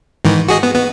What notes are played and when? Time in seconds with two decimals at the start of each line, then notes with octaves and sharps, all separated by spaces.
0.25 G#2 D#3 E3
0.48 F#4 G#4 D#5
0.63 B3
0.75 B3